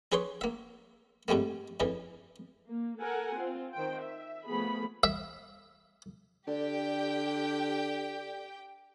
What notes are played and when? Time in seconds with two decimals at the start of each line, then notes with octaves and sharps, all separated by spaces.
0.12 D4 G#4 B4 C#5 C6
0.41 A#3 E5
1.28 G#2 C3 G3 A3 A#3
1.80 F2 C#3 E3
2.69 A#3
3.01 A4 A#4 F#5 G#5
3.37 C4 F4
3.74 D#3 C5 G5
4.02 E5
4.48 F3 A3 B3 G#4 B5
5.03 E5
6.47 D3 G4 A4 D5 G5